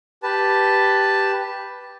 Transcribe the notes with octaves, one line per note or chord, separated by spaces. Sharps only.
G4 B4 A5